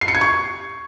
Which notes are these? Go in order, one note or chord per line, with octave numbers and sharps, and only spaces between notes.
C7
C#7
G#6
C#6